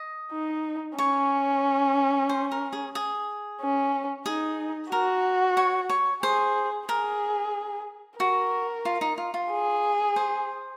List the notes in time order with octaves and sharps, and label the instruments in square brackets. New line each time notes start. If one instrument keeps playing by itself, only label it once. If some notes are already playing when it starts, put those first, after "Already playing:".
Already playing: [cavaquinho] D#5
[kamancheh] D#4
[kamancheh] C#4 [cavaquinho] C#5
[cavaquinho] C5
A#4
G#4
G#4
[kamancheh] C#4
[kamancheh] D#4 [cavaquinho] G#4
[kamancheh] F#4 [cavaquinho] A#4
[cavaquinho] C#5
C#5
[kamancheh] G#4 [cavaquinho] C5
[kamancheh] G#4 [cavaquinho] A#4
[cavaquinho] F#4 [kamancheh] A#4
[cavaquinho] F4
D#4
F4
F4
[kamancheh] G#4
[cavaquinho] C5